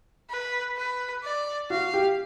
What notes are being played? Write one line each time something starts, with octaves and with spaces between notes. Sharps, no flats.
B4
B4
D5
F#4 F5
G4